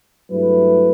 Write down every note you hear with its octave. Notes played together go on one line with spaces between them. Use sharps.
G2 F#3 A3 E4 B4